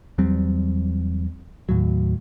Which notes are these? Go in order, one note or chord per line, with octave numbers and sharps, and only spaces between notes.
E2 F#3 G3 C4
D#2 A2 F#3